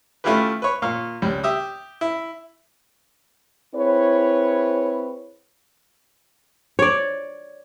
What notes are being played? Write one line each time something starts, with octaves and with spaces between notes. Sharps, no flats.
A3 C#4 E4 F4 G4 B4
B4 C#5
A#2 F5 C#6
C#2 G3
G4 E5 D#6
E4
C4 E4 G#4 B4 C#5
C#5 D5